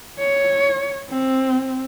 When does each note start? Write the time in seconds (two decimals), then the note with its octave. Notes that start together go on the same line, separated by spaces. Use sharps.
0.19 C#5
1.09 C4